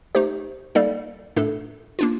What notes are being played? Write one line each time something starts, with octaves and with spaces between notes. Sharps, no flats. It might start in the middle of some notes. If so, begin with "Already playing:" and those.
A3 D#4 G4 C5
G3 A#3 D#4 A4 D5
A2 A3 D4 A4
A#3 D4 F4